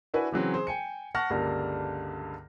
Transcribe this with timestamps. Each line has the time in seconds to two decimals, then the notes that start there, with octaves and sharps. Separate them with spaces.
0.14 D4 E4 F#4 B4 G#5
0.32 C#3 E3 F#3 C4
0.54 G#4 C5
0.67 G5 G#5 C#7
1.15 F#5 A5 C#6 F6 A#6
1.30 C#2 G2 D3 G3 A#3